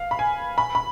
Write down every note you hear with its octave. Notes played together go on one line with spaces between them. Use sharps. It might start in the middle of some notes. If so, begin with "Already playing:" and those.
Already playing: F5
B5
G#5
B5
B5